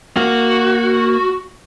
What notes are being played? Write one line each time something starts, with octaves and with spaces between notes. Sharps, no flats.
A#3 F#4